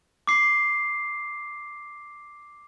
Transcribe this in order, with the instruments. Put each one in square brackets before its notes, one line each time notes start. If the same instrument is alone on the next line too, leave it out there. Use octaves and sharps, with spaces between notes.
[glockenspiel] D6 C7